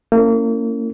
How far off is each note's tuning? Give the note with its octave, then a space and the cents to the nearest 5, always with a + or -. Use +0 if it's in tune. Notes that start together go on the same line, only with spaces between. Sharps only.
A#3 -35 C#4 +0 E4 +0